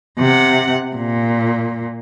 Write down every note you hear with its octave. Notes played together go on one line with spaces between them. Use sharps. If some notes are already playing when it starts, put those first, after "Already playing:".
C3 F#5
A#2